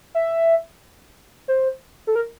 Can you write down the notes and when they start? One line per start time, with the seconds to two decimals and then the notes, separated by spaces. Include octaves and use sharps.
0.15 E5
1.48 C5
2.07 A4
2.15 A#4